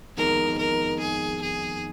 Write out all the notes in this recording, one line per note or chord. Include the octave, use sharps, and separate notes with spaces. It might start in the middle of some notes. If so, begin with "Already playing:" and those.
F2 D#3 G#3 B3 D#4 A#4
A#4
G#4
G#4